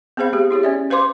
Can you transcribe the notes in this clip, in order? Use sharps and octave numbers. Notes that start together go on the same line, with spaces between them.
B3 C4 G#4 C5 F5 B5
A3 G4 G#4
E4 G4 G#4 C#5
C#4 D5 E5
B4 C5 F5 C6 D6